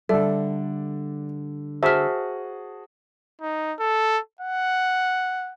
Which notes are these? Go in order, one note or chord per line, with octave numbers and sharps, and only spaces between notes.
D3 G3 A4 D5 E5
F#4 G#4 C5 E5 A5 F6
D#4
A4
F#5